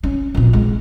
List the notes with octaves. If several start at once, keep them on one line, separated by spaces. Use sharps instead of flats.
C#4
A#1 B2
G#3